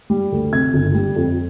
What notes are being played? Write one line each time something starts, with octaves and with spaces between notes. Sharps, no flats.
G3
D2
C3 G#6
G1
G3
F2